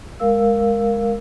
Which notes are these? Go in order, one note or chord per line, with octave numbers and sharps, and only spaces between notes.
G#3 A#4 F5 E6